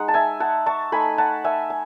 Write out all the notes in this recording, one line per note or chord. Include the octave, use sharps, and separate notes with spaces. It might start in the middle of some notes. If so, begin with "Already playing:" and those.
Already playing: G#3 D#4 F#5
A5
E5 G#5
F#5 A5
A5 C#6
A3 D#4 G#5 B5
F#5 A5
E5 G#5
G#5